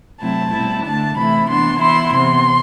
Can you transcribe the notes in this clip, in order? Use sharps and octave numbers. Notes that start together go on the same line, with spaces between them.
C3 F#3 A3 C4 E4 A5
B2 G3 C4 E4
D3 A3 D4 A5
C3 E3 A3 E4 B5
E3 B3 D4 C6
E3 B3 E4 C6
C3 E3 B3 C6